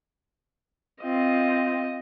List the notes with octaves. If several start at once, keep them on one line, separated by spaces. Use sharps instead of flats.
C4 F4 D#5